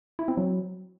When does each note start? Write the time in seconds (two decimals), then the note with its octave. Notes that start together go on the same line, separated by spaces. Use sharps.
0.19 E4
0.28 C4
0.37 F#3